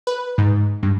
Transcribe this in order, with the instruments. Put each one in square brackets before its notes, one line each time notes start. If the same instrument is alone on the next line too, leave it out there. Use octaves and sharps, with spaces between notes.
[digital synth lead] B4
G#2
G2